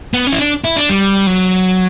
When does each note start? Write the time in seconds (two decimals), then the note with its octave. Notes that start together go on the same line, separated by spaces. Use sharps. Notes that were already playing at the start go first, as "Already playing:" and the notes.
0.14 B3
0.27 C#4
0.33 E4
0.39 D4
0.64 E4
0.77 D4
0.89 G3
1.27 F#3